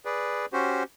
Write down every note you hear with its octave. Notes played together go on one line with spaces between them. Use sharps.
G#4 B4 D5
C#4 F#4 G4 C5